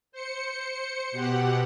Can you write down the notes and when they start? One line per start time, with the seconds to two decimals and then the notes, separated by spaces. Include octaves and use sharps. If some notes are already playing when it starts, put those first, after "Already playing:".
0.12 C5 C#7
1.12 B2 G4 F#5